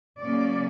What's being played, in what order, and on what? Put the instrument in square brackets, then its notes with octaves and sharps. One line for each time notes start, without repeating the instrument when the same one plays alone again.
[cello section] C#3 F#3 A#3 C#4 D5